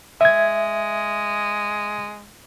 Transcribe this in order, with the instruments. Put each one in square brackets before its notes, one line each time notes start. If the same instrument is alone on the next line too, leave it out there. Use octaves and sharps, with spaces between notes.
[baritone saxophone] G#3 [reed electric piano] E5 G#6